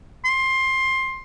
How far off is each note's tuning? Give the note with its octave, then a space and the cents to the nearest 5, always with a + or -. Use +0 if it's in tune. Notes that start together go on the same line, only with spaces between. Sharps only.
C6 +20